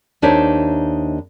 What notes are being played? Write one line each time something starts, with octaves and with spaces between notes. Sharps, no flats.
D#2 D4 D#4 C5 C#5 E5